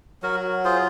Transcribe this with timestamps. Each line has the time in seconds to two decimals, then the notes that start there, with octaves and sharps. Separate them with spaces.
0.22 F#3 F#4 A#4
0.65 F4 G#4 C5